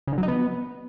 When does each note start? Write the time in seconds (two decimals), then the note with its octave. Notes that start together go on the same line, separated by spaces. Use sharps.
0.07 C#3
0.13 D3
0.18 F#3
0.23 D#4
0.28 B3